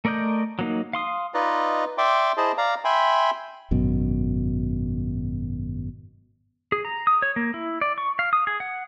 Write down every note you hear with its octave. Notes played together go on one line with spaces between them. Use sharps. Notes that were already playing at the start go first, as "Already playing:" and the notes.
A3 A#4 D5 D#5 G6
F#3 A#3 D#4
F5 C6 D#6
D#4 F4 B4 D5 D#5
D5 E5 G5 C6 D6
E4 G#4 C5 D#5 A5
D5 F5 A#5
E5 G5 G#5 B5 C6
G#1 F#2 B2
G#4
A#5
D#6
C#5
A#3
E4
D5
C#6
F5
D#6
G#4
F#5